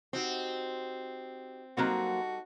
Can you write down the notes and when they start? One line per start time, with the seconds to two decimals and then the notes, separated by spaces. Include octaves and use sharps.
0.13 C4 D#4 F#4 G4
1.77 F#3 G3 A#3 C4 D#4 F#4 A4